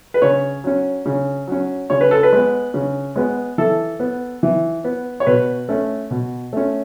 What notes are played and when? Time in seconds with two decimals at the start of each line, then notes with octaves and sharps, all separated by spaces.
0.14 B4
0.22 C#3 C#5
0.64 F#3 C#4
1.06 C#3
1.48 F#3 C#4
1.90 C#3 C#5
2.01 B4
2.11 A4
2.23 B4
2.33 G#3 B3
2.74 C#3
3.16 G#3 B3
3.58 E3 A4
4.00 B3
4.43 E3
4.84 B3
5.20 C#5
5.26 B2 B4
5.69 A3 C#4
6.10 B2
6.53 A3 C#4